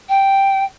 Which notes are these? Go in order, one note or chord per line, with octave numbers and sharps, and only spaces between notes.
G5